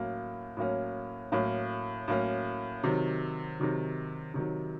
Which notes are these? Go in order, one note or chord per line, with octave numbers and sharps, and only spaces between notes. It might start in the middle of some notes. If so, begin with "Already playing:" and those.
Already playing: A2 F#3 A#3 C#4
A2 F#3 A#3 C#4
A2 F#3 A#3 C#4
A2 F#3 A#3 C#4
C3 D#3 F#3
C3 D#3 F#3
C3 D#3 F#3